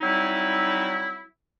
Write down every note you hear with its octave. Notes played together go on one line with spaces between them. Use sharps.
F#3 G3 C4 D#4 E4